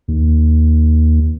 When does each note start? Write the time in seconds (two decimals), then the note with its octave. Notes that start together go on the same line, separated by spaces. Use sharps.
0.08 D#2